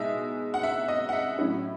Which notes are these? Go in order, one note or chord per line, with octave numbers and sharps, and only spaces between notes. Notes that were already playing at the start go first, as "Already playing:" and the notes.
Already playing: B2 G#3 D#4 E5
F#5
E5
D#5
F#5
E5
A2 F#3 C#4 E4